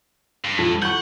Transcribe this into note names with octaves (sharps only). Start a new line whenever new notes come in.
G2
F2
F#5 C#6 G6